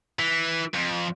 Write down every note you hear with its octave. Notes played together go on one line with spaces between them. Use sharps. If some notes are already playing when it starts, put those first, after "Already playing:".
E3
F2